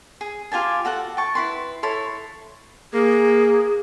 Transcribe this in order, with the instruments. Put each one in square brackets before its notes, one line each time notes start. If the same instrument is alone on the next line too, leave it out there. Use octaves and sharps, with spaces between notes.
[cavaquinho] G#4
F4 G4 G#5 A5
F#4 A4 F#5
G5 A5 C#6
E4 B4 C6
E4 A4 C#5 C6
[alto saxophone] A#3 [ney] G#4